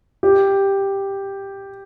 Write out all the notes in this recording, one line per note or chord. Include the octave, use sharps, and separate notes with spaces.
G4